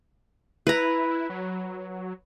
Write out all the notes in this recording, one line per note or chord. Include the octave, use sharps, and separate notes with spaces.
E4 B4 A#5
F#3